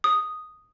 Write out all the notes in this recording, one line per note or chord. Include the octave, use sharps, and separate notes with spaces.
D#6